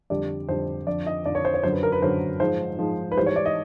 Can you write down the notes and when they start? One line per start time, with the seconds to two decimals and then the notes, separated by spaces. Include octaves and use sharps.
0.10 F2 D3 G3 D5
0.48 F2 D3 G3 C5
0.87 F2 D3 F3 D5
1.07 D#5
1.25 F2 D3 F3 D5
1.35 C#5
1.45 C5
1.54 C#5
1.63 F#2 D3 F#3 C5
1.73 B4
1.83 A#4
1.92 B4
2.02 F#2 D3 F#3 C5
2.40 G#2 F3 G#3 C5
2.79 G#2 F3 G#3
3.12 B4
3.17 G#2 E3 G3 C5
3.26 C#5
3.36 D5
3.46 D#5